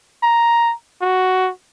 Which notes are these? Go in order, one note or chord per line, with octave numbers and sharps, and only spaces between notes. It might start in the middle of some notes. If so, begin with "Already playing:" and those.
A#5
F#4